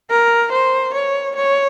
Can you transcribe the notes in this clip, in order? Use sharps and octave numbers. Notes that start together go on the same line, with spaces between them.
A#4
C5
C#5
C#5